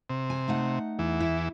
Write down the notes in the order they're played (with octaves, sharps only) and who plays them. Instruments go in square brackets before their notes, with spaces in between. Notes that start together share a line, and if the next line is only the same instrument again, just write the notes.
[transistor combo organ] C3
[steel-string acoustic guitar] G#5
A3 D#4 F#5
[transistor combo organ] E2 E3
[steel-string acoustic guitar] E4